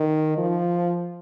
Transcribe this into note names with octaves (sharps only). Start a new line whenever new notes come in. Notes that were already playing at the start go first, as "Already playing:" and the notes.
Already playing: D#3
F3